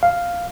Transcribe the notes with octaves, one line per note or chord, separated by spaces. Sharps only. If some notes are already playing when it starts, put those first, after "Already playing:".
F5